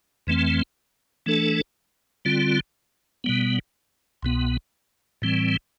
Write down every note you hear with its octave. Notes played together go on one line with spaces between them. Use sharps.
F2 E3 A3 C4
E3 A3 D4 A4
D3 G3 C4 F4
B2 G3 B3
C2 B2 B3
A2 E3 G3 C4